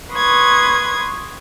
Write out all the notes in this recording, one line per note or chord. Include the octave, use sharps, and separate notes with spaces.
B4 C6 C#6 D#6 G#6